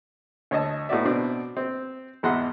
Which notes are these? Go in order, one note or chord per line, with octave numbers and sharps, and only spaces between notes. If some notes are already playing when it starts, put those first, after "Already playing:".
D2 C#5 D#5 A5
A2 B3 D#4 F#4 D5 E5
B2 B3 C4 D4
C4
G#1 E2 D#4 E5 F#5 C6